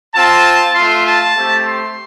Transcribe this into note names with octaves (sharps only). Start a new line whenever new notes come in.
C4 F4 A5
A3 F4 C6
A5
A3 C4 G4
C6